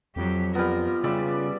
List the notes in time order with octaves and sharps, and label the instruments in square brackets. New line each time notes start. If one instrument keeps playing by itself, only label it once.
[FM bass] F2 [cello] F#3 G4
[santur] G3 B3 [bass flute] F4 [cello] A#4
[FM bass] C#3 [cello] G3 [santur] D5 E5 D6